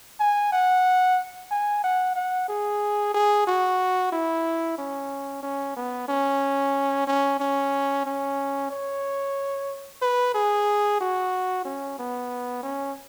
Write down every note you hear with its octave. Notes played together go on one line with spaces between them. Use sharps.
G#5
F#5
G#5
F#5
F#5
G#4
G#4
F#4
E4
C#4
C#4
B3
C#4
C#4
C#4
C#4
C#5
B4
G#4
F#4
C#4
B3
C#4